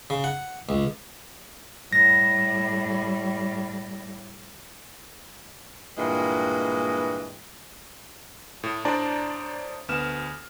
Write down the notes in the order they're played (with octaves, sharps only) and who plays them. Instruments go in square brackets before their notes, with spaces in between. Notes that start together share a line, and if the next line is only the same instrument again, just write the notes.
[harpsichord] C#3
F#5
C#2
[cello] A2 G3 [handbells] A#6
[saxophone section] G2 A#2 E3 G#3
[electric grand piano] A2
A2 D4 C5 D5 A5 A#5
D2 B3 F6 E7